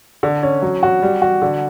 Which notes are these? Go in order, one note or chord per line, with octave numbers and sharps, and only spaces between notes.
D3
C#4
F#3
F#4
G3
F#4
D3